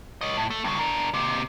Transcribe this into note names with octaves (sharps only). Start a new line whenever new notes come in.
C#5 D#5
A2
A3
G2 C#3
D4 A#4
D#2 C3